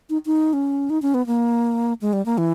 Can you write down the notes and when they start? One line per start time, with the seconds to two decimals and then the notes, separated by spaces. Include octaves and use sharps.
0.10 D#4
0.26 D#4
0.53 C#4
0.90 D#4
1.02 C#4
1.14 B3
1.27 A#3
2.01 G#3
2.13 G3
2.26 A#3
2.38 E3